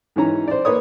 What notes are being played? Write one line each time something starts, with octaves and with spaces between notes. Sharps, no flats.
G#2 E3 C#4 A#5
C5 D5
A#3 B4 C#5 D#6